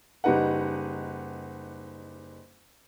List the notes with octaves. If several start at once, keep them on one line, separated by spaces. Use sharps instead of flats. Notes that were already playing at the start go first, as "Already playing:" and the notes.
F#1 G3 D#4 B4 F#5